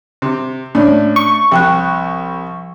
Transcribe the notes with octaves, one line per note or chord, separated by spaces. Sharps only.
C3
A2 C#4 D4
C#6
C2 F3 G5 F#6